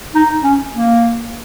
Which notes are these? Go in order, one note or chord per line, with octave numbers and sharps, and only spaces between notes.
D#4
C#4
A#3